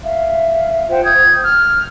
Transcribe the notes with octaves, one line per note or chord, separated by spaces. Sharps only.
E5 F5
F4 C5 F#5 G5
D#6 G6 G#6
F6